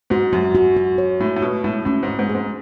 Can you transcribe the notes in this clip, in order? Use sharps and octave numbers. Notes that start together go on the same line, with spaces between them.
G#2 F#4
F#2 F#4
F#4
F#4
C#5
A2 G#3
A2
B2 F#4
A2 G#3
A2 C#4
G#2
C#4
G#2
G#4
G#2